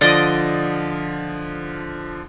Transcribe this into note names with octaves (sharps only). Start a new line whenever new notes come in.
D3 F3 F4 D5 D#5